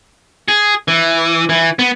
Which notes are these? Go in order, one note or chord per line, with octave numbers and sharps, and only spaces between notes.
G#4
E3
E3
B3